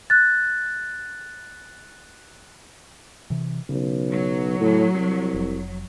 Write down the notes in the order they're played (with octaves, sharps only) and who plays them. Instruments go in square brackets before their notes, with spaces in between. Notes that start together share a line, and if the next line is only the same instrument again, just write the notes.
[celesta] F#6 A6
[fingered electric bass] C3 E3
[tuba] B1 [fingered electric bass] C#3
[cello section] F#3
[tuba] A2
C2
[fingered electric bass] F1